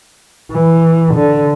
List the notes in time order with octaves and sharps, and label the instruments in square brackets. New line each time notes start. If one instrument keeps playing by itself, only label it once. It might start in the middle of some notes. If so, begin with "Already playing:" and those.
[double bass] E3
D3